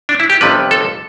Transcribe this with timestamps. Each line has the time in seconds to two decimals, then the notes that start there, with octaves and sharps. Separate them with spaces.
0.09 D4
0.20 E4
0.30 G4
0.41 G1 F2 C3 G3 B3 B4
0.71 A4